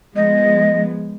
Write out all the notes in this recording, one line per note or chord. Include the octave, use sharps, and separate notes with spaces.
F3 G#3 B3 D#5